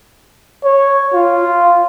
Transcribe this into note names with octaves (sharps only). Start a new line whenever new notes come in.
C#5
F4